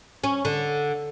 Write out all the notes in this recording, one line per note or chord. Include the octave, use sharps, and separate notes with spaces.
C#4
D3